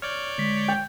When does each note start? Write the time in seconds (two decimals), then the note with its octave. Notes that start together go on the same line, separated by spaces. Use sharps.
0.02 C#5 D5 F6 G6
0.38 D3 G#3 B6
0.68 G5